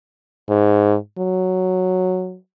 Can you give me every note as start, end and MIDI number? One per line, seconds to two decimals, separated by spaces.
0.49 0.96 44
1.18 2.37 54